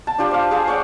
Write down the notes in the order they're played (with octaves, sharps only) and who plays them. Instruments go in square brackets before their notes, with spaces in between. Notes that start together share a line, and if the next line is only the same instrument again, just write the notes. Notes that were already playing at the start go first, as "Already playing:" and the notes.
[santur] G5 A5
D4 F4 G4 G5
C5 F5
G#4 C5 F5 A5
C#5 D5 F#5 G5